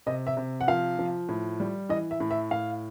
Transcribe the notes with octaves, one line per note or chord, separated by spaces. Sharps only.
C3 D#5
E5
C3
F#5
F3 F5
F3
A2
G3
E3 D#5
E5
A2
E5
A2 F5